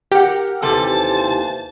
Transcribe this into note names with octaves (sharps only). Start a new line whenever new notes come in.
G4 A#4 F#5
D#2 C3 E3 G3 A4 C5 A5